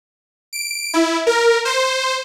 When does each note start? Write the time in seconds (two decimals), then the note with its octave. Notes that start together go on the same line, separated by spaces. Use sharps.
0.53 D7
0.94 E4
1.27 A#4
1.65 C5